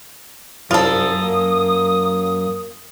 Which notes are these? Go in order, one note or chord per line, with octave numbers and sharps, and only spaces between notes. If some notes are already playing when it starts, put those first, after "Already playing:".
C2 F#2 F4 A4 A#4 D#6
A#3